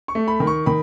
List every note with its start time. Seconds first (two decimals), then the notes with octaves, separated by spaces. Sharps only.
0.08 C#6
0.15 A3
0.28 B5
0.40 D#3
0.47 C#6
0.66 D#3 B5